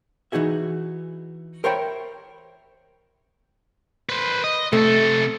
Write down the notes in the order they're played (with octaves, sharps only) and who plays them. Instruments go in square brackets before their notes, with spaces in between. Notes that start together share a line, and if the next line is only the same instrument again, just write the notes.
[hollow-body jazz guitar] E3 D#4 F#4 G#4 E5
A#4 C5 C#5 E5 G5 B5
[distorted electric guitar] B4 C5
D#5
[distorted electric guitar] C3 A4 [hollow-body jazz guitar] A3